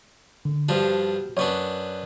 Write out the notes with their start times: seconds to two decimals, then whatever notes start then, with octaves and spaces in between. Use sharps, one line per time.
0.45 D3
0.69 G2 F3 D4 F#4
1.37 F#2 B3 D4 C#5 D5 C#6